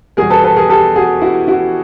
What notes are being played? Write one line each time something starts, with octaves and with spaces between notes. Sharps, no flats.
E2 B2 G3 G#4 A#4
A4 B4
A4 B4
G#4 A#4
G4 A4
F#4 G#4
E4 F#4
E4 F#4